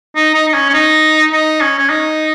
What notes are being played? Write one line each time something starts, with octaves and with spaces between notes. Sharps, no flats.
D#4
D#4
D#4
C#4
C#4
D#4
D#4
C#4
C#4
D#4